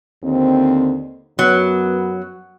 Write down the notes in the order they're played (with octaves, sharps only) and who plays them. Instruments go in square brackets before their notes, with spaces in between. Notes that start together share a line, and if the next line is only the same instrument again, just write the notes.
[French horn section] D#2 D3 C4
[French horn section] F#2 B3 [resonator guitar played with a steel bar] F#3